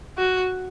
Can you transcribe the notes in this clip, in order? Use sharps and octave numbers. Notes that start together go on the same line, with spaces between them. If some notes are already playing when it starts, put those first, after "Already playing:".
F#4